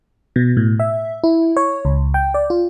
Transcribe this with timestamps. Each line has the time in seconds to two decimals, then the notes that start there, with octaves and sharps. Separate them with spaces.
0.36 B2
0.57 A2
0.80 E5
1.24 E4
1.57 C#5
1.85 C#2
2.14 G5
2.34 D5
2.50 F4